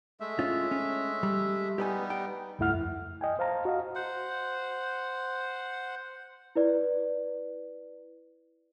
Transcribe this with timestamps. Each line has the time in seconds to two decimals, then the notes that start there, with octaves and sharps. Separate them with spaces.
0.20 G#3 A3 E5
0.39 C#4 F4
0.71 C#4
1.23 G3
1.78 G3 B3 D#4 G4 B4 G#5
2.10 G5
2.59 C#2 G2 A3 E4 F#5 F6
2.70 F2
3.21 D#5 G5 G#5
3.39 C5 F5 A5 A#5
3.65 F#4 D#5 F5
3.95 C5 F#5
6.56 E4 B4 D5